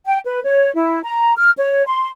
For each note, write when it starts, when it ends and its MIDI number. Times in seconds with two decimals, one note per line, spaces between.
0.06 0.18 79
0.25 0.40 71
0.45 0.72 73
0.75 1.01 64
1.03 1.33 82
1.36 1.50 89
1.57 1.83 73
1.87 2.08 84